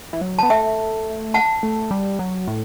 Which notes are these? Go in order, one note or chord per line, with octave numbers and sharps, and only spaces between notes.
E3
F#3
B3 A5
A3 E5 G5
F#5 A5
A3
G3
F#3
A2